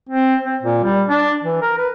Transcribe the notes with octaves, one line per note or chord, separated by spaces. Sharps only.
C4
C4
A#2
G3
D4
E3
A#4
B4